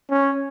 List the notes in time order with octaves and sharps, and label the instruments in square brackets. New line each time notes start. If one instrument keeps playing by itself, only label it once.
[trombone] C#4